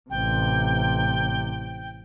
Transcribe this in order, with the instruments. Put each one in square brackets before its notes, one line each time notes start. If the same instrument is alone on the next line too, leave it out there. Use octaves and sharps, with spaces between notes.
[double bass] A1 C3 [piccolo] G5